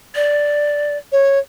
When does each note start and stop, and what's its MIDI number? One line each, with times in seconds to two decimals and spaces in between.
0.15 0.97 74
1.12 1.39 73